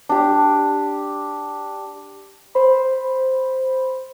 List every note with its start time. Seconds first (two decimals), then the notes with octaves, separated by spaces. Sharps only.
0.09 D4 G4
2.55 C5 B5